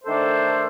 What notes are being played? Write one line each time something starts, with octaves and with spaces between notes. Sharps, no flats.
D#3 A3 D4 A4 C5